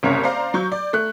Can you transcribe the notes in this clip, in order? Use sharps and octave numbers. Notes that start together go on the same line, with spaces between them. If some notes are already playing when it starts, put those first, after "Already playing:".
F#1 C2 C#4 A#4 C#5
C5 D5 F5 A#5
F#3 C#6 G6
D5
A3 F#6